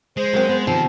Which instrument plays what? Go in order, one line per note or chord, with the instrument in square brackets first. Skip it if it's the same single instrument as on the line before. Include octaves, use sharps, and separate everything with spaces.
[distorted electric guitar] G#3 [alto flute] C5
[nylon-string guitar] F#3 A#3 C4
B3
[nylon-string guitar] C3 F3 [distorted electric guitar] D#3 [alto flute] A5